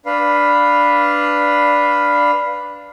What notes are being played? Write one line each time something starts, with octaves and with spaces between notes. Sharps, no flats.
D4 B4 F5